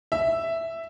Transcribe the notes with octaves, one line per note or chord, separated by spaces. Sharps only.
E5